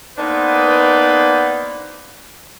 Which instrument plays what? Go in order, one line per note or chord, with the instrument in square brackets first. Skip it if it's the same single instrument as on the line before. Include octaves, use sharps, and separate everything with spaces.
[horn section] A#3 B3 D4 D#4 B4 C5